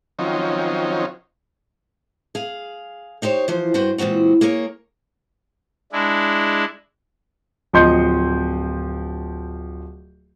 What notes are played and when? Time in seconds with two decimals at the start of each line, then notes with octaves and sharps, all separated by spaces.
0.19 D#3 F3 F#3 C4 C#4 D#4
2.35 G#4 F5
3.22 D#4 G4 C5 C#5
3.48 E3 F3 C5
3.74 G2 F#4 B4 C5 G5
3.98 A#2 E3 G#3 C4 F#4
4.41 A#3 G#4 A#4 C#5
5.92 G#3 D4 E4
7.73 D1 F3 D#5 C6 G6 C#7